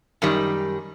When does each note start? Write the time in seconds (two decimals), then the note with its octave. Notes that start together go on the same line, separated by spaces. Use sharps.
0.22 F#2 D#3 G3